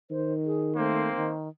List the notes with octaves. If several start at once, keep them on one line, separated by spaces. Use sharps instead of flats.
D#3 C5
G#4
A3 A#3 C4 C5
D#3